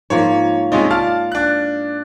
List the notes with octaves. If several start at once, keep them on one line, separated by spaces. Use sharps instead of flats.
G#2 F3 A#3 C#5
C3 G#3 C#4 D#4 F4
D5 F5 A5 F6
D4 F#6